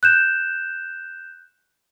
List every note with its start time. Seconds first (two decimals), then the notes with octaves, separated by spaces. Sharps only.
0.03 F#6 G6 E7